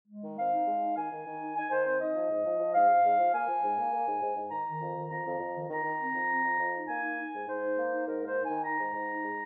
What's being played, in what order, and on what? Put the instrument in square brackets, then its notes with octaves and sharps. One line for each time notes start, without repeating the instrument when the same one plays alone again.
[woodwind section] G#3
D#3
C4 F5
D#4
G#3
D#4
D#3 G#5
D#3
D#3
D#4
D#4 G#5
D#3 C5
C4 C5
D#4 D#5
F3
G#2
F3
F3
G#2 F5
G#2
G#2
F3
A#3 G#5
F3
G#2
A#3
A#3
G#2
G#2
G#2
D#3 A#5
D#3
F2
D#3
F2 A#5
F2
F2
D#3
D#3 A#5
D#3
C4
F2
C4
F2
F2
D#4
A#3 G#5
D#4
D#4
G#2
G#2 C5
D#4
A#3
D#4
G#2 A#4
A#3 C5
D#4
G#5
D#3
D#4 A#5
G#2
G#2
D#4
G#3